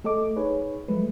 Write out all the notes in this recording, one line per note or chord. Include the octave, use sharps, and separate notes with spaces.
A3 A4 D#5 D6
D#4 G#4 B4 C#5
F3 F#3 G#3 A3 B4